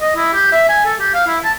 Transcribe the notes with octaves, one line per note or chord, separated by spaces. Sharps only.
D#5
E4
G4
E5
G#5
A4
G4
F5
E4
A5